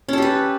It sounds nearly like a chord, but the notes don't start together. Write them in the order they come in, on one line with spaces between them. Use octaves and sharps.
C#4 A4 G4 B4